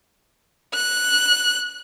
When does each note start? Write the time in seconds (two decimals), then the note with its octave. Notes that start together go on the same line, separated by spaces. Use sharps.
0.74 F#6